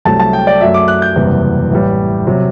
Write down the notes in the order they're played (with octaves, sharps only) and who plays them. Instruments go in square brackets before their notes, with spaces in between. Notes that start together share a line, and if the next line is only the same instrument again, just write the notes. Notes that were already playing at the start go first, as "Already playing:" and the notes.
[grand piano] C2 C3 F#3 A3 A5
A5
G5
D5
F#2 F#3 A3 E5
D6
F#6
G6
F#1 E2 C3 G3
A1 A2 G3
C3 F#3